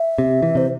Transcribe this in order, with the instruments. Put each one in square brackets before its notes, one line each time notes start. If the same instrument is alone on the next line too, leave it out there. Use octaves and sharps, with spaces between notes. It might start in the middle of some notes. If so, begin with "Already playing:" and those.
Already playing: [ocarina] E5
[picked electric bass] C3
E3
[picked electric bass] C3 [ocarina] C5